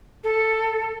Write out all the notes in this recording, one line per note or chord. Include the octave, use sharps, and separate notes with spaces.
A4